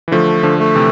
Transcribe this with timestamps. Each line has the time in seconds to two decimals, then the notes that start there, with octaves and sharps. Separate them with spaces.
0.08 E3
0.12 D3 F3 A3
0.43 D3 F3
0.59 A3
0.75 C3 E3